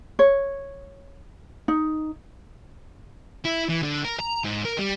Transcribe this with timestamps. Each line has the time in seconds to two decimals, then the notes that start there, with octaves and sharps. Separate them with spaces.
0.19 C#5
1.68 D#4
3.45 E4
3.69 E3
3.83 D3
4.05 A#4
4.19 A#5
4.44 G#2
4.65 A#4
4.79 G3